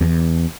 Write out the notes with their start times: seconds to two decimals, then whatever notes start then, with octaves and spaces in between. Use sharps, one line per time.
0.01 E2